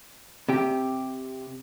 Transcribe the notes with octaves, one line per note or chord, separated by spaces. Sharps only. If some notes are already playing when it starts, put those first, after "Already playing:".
C3 G4